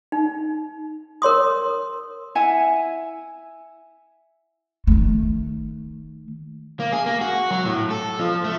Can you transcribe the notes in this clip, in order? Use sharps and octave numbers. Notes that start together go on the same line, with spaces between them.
D#4
A#4 C#5 C6 D#6
E4 E5 F#5 G#5
D#3 A3
A#3
G#4
A#3
F#4
F#3
A2
A4
F3
A3